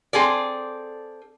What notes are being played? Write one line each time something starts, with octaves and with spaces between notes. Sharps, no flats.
C4 G#4 A4 D5